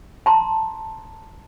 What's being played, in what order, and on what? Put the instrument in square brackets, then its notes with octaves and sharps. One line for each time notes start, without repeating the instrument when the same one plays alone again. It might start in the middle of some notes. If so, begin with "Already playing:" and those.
[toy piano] A5 A#5 C6